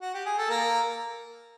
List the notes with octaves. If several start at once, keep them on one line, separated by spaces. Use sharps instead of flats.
F#4
G4
G#4
A4
A#3 A#4